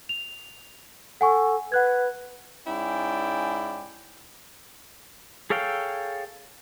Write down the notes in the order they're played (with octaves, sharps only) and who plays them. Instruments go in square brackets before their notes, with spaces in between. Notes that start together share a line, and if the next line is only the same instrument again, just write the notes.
[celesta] F7
[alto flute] A4 [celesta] F#5 G#5 C#6
[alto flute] B4 [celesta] F#5 F#6 G#6
[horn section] G#2 C#4 E4 D5 G5
[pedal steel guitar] G#4 A4 C#5 F5 G5